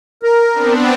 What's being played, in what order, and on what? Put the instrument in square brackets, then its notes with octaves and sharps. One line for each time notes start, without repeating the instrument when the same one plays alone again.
[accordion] A#4
[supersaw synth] B3 C4 D4